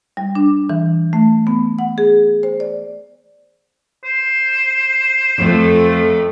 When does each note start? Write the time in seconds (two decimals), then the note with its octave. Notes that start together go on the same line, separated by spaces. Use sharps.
0.17 G3
0.35 D4
0.69 E3
1.13 A3
1.47 B3
1.79 F#5
1.98 G#4
2.43 C5
2.60 D5
4.04 C5
5.38 F2 A3